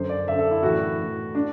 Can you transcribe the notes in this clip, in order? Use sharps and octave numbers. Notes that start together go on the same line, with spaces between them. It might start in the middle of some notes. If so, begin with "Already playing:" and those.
Already playing: F#2 D3 C5
D5
F#2 D3 E5
A4
E4
A2 E3 F#4
A2 E3
D4